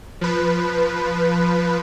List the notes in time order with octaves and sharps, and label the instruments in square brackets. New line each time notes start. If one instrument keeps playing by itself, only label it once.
[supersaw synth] F3 B4